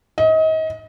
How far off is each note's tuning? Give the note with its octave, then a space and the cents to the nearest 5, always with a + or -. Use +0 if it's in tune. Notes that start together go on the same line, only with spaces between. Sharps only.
D#5 +30